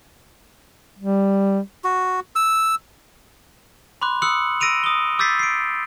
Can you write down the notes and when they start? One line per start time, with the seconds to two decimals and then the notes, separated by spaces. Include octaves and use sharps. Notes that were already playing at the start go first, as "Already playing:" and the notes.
0.98 G3
1.84 F#4
2.36 E6
4.02 B5 C6 D6 F#6
4.22 D#6 E6 F#6 C#7 F#7
4.60 E6 A#6 D7 D#7 F7
4.84 D#6 G7
5.19 D6 E6 G6 A6 B6 C7
5.39 C7 D7